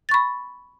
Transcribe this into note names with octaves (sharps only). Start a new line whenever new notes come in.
B5 C#6 A6